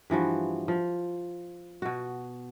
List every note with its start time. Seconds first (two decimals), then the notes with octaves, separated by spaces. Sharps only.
0.10 G2 E3 F3 F#4
0.68 F3
1.82 B2 F#4